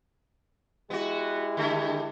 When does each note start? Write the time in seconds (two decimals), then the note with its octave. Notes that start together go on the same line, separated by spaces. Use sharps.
0.90 G#3 B3 E4 F#4 G4
1.57 D3 A3